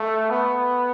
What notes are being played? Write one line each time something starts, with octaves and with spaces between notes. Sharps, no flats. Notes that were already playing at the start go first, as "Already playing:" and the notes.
Already playing: A3
B3